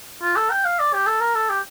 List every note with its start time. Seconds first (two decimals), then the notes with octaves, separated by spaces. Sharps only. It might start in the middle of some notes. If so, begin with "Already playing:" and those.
0.22 F4
0.36 A4
0.51 G5
0.65 F5
0.79 D5
0.93 G4
1.06 A4
1.20 A#4
1.35 A4
1.49 G4